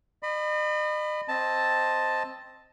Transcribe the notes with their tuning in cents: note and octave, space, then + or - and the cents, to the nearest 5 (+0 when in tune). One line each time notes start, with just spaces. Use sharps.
D#5 -40 B5 +15
C4 +5 D#5 +0 A5 +0